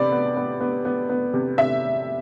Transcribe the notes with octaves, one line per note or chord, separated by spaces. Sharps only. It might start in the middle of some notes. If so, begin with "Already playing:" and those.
Already playing: C3 B3 D5 B5
B3
B3
B3
B3
B3
C3
C3 E5